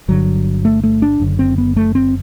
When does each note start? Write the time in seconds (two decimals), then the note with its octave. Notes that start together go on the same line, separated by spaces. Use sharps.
0.08 G1 G2 D3 F#3
0.65 A3
0.83 A3
1.02 D4
1.20 F#1 F#2 D3
1.39 C4
1.58 B3
1.76 A3
1.95 C4